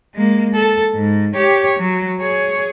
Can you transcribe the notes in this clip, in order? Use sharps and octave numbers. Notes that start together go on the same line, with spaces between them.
G#3 A#3
A4
G#2
G4 C#5
F#3
G#4 C#5